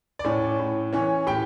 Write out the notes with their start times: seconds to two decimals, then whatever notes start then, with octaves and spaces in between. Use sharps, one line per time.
0.19 D5
0.24 A2 C#4 C#5
0.60 A2
0.93 E3 C#4 C#5
1.27 A2 G4 G5